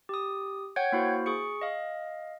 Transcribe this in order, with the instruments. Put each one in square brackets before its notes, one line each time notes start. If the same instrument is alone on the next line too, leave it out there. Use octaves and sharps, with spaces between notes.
[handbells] G4 D#6
C#5 F#5 G5 G6 G#6
A#3 E4 F#4 C5
G#4 C#6 C#7
D#5 F5